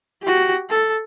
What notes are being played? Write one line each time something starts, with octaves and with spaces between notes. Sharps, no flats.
F#4 G4
A4